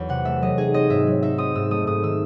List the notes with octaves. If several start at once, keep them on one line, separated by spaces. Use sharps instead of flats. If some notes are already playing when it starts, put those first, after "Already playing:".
Already playing: E2 F#3
C3 F#5
A3 E5
F#3 D#5
D#4 G#4
C4 D#5
G#2 E5
F#3
D#4 E5
C4 D#6
G#2 E6
A3 D#6
G#2 D#6
D#3 E6